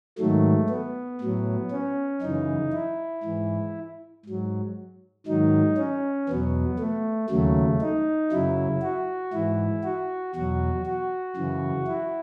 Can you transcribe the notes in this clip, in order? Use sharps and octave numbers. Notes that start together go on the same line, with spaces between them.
G#2 D#3 F#3 A3
B3
A2 F#3
C#4
F#2 C#3 E3 D#4
E4
G#2 E3
G#2 F#3
G#2 D#3 F#3 D#4
C#4
E2 B2 F#3 B3
A3
D#2 C#3 F#3 A3
D#4
F#2 C#3 F#3 E4
F#4
G#2 E3 E4
F#4
E2 B2 F#3 F#4
F#4
F#2 C#3 E3
E4